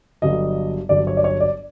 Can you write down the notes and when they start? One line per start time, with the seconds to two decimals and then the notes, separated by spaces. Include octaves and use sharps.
0.22 G1 G2 D3 F#3 D#5
0.89 G1 G2 D3 F#3 D5
1.07 C#5
1.17 D5
1.24 C#5
1.40 D5